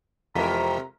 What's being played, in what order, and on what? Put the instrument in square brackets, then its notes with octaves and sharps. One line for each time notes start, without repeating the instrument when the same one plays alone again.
[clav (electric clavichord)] F2 E3 [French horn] C3 [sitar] G#3 A#4 [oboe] A#5